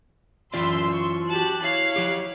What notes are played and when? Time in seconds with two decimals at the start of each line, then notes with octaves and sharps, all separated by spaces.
0.54 F#2 E3 F4 D5 B5 C6 E6
0.91 C#6
1.29 F#4 G4 A5 F#6
1.62 E4 C#5 F5
1.96 F3 G4